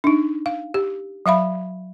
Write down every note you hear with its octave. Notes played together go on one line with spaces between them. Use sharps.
D4 D#4
F5
G4
F#3 E5 F5 B5